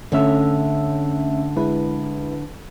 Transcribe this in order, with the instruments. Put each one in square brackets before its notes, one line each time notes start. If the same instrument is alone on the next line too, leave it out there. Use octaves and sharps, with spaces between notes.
[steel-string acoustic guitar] D3 [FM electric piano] A3 C#4 E5
[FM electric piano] G#3 E4 B4